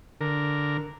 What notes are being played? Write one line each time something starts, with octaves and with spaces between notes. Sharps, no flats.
D3 A#4